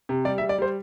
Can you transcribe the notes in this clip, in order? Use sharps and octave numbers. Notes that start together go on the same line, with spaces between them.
C3
G3 D5
E5
G3
D5
G3 C5